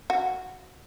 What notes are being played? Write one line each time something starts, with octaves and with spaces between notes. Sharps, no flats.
F#4